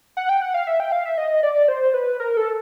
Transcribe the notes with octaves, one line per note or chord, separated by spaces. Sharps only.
F#5
G5
F#5
F5
E5
G5
F5
E5
D#5
D5
C5
B4
A#4
A4